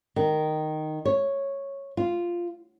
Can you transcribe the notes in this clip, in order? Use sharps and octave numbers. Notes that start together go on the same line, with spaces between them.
D#3
C#5
F4